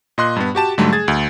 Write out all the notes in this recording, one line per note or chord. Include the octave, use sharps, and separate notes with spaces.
A#2 D#5 C6 F#6
G2 B3
F#4 G4 A5 E7
G#2 D3 F#3 G3 A3
G#4 G#6 A6
D2